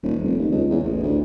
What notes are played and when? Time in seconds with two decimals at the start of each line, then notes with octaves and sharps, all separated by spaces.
0.03 D#1
0.23 F1
0.38 D#2
0.51 C#2
0.70 E2
0.83 A1
1.03 D2